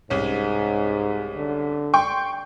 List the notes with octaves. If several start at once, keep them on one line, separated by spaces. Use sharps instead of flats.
C2 G#2 C#4
D3
G5 C6 C#6